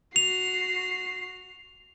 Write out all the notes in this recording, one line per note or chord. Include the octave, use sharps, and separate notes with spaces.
F#4 C7 F7